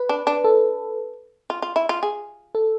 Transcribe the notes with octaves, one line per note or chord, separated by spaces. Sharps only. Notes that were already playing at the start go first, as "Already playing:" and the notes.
Already playing: B4
D4
D4
A4
F4
F4
E4
F4
G#4
A4